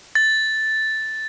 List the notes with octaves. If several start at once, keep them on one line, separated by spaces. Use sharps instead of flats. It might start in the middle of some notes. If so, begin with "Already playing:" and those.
A6